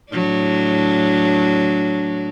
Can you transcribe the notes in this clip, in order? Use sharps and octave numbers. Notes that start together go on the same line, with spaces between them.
A2 F#3 D4